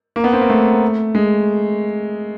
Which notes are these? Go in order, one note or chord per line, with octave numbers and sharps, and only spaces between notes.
A#3
B3
C4
A#3
A3
G#3